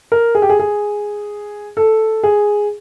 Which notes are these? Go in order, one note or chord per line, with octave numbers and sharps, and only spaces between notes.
A#4
G#4
G4
G#4
G#4
A4
G#4